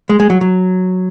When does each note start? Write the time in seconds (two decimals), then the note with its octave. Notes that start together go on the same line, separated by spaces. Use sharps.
0.09 G#3
0.20 G#3
0.30 F#3
0.41 F#3